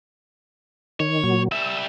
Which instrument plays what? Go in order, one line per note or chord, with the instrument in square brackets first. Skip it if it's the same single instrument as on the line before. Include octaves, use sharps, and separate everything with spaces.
[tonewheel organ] D#3 [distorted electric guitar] C#5
[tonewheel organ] A#2 F#3
[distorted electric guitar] G3 E5 [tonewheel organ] E6